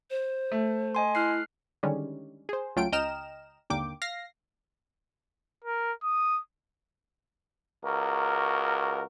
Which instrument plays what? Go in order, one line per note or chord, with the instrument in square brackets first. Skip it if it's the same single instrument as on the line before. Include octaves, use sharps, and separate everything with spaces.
[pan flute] C5
[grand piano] A3
[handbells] D#5 G#5 C6
[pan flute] E4 [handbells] F6 F#6 C7
[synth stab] D3 D#3 G3 G#3 C#4
G#4 C5
C#2 F#3 A3 F4 G5 D7
C#2 D#5 G5 A#5 F6 E7
G#1 D#2 D3 A#3 G5 D6
F5 A#6 C7
[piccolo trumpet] A#4
D#6
[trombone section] C#2 F#4 A#4